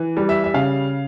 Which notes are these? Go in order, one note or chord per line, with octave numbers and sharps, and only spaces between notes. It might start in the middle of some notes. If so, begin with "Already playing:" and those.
Already playing: E3
G3
E5
E5
C#3 F5